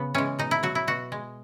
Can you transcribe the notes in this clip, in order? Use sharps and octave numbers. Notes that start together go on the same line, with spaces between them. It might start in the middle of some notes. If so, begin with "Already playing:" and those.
Already playing: C#3 B3
E3 G#3 C#4
B2 D#4
E4
F#3 F#4
E4
B2 F#4
G#3